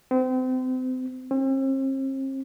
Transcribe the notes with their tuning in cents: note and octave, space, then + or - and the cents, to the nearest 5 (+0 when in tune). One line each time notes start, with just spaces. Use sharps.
C4 -35
C4 +40